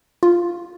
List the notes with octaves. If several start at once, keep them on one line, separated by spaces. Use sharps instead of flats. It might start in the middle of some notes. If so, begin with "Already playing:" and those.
F4